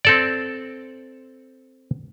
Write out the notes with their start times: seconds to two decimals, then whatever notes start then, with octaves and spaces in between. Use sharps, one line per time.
0.05 C4 A4 D5